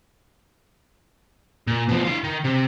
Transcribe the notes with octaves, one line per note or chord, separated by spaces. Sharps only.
A#2
B2 F3
E4 F5
D#3
C3